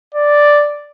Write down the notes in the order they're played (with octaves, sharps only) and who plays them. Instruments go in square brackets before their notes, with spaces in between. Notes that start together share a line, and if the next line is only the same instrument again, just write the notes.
[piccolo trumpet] D5